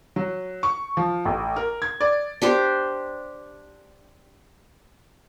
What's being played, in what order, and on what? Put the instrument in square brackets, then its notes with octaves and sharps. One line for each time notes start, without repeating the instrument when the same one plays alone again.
[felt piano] F#3
C#6
F3
A1
A#4
G#6
D5
[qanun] D4 G4 C5